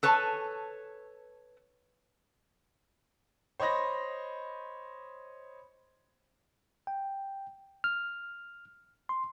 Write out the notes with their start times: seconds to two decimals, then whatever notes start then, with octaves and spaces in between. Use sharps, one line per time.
0.03 A4 B4 C#5 G#5 A5
3.60 C5 C#5 D#5 B5 A#6
6.87 G5
7.84 F6
9.09 C6